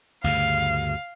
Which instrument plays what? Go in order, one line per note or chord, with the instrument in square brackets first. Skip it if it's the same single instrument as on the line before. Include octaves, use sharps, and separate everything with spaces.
[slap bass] D2 G2 C#3 [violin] F5